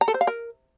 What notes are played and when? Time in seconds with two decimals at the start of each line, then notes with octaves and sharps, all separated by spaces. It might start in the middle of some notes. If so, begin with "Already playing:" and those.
0.01 A#5
0.08 A4
0.14 C5
0.21 F5
0.27 A#4